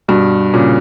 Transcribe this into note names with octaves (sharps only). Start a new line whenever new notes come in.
G2 B2
A#2 C#3